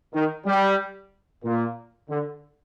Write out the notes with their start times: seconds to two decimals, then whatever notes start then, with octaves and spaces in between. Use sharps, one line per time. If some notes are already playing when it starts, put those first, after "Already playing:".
0.14 D#3
0.46 G3
1.44 A#2
2.09 D3